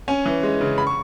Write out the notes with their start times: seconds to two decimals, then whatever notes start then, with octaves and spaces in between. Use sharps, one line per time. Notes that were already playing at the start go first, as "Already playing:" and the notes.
0.08 C#4 G#5
0.26 E3
0.43 G#3
0.61 C#3
0.78 B5
0.87 C#6